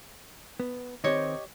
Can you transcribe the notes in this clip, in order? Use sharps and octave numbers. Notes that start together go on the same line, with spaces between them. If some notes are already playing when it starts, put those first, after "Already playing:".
B3
D#3 C4 G4 C#5 D#5